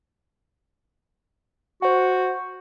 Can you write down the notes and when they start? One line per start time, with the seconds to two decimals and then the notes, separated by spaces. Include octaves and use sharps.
1.82 F#4 C5 F#5